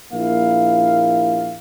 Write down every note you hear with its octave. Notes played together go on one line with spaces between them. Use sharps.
A#1 A#3 E4 F5